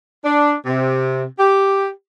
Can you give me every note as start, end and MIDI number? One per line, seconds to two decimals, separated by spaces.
0.25 0.54 62
0.66 1.24 48
1.39 1.89 67